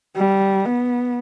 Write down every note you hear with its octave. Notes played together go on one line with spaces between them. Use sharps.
G3
B3